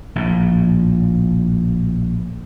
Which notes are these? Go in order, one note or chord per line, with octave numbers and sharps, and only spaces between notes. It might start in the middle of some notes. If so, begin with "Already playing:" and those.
A#1 A2